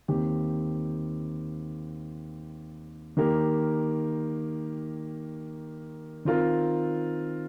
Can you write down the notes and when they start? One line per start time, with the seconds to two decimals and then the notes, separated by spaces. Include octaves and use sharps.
0.08 D#2 D#3 C4 G4
3.17 D#3 A#3 G4 A#4
6.25 D#3 C4 F4 A#4